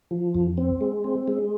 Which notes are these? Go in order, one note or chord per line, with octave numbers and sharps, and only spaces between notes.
F3
F2
C4
G#3
C4
G#3